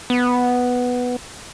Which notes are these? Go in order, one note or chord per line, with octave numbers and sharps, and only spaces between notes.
B3